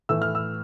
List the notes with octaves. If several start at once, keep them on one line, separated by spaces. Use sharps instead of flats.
A2 E3 A3 E6
F6
E6